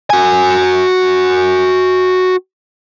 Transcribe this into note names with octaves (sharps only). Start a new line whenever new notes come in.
F#4 G#5